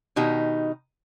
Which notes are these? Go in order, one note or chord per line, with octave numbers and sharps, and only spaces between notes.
B2 D#3 D#4 G4